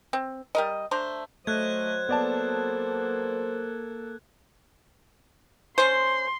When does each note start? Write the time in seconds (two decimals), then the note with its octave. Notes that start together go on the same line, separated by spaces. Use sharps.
0.13 C4
0.55 G3 A#4 D#5
0.91 A3 D4 C5 A#5
1.47 F#3 A3 C5 D#5 F#6 G#6
2.09 A#3 B3 A4 D5 A5
5.78 C#4 C5 C6